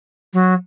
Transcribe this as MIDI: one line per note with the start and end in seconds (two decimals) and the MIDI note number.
0.33 0.54 54